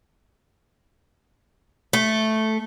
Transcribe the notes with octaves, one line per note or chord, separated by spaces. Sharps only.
A3